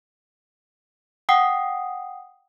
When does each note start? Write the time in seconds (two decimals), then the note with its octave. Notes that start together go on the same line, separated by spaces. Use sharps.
1.29 F#5 G5 D#6 C7